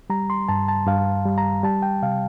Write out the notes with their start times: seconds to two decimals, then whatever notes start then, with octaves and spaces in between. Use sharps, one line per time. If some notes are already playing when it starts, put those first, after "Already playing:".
0.10 G3 A#5
0.30 C6
0.49 G2 A5
0.68 A5
0.87 G2 F5
1.25 G3
1.38 A#5
1.63 G3 A5
1.82 G5
2.03 C3 F5